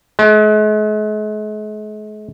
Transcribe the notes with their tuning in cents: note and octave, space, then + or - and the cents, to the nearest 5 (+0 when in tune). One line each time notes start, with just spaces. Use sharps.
G#3 +40